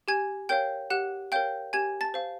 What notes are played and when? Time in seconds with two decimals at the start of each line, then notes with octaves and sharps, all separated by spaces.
0.08 G4 G#5 G#6
0.49 A#4 C#5 F5 G5 G6
0.90 G4 F#5 F#6
1.32 A#4 C#5 F5 G5 G6
1.73 G4 G#5 G#6
2.01 A5 A6
2.14 C5 F5